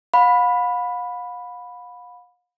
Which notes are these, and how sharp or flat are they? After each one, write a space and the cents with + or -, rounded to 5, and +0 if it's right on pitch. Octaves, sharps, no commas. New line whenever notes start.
F5 +45 B5 +0